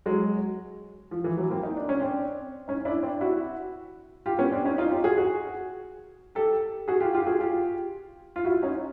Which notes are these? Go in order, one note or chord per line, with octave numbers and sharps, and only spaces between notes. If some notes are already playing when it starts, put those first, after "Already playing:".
F#3 G#3
F3
E3
E3 F#3
A#3 C4
D#4
D4
C#4
C4 D4
C#4 D#4
D4 E4
C4 D4
E4 F#4
F4 G4
B3 C#4
C4 D4
C#4 D#4
D#4 F4
F4 G4
F#4 G#4
F#4 G#4
G4 A4
F#4 G#4
F4 G4
F4 G4
F#4 G#4
F4 G4
F4
E4 F#4
C#4 D#4